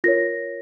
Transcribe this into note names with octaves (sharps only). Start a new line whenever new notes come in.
F4 A#4 C#5 A#6